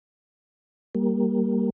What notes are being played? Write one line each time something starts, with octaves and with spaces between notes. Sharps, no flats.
G3 A#3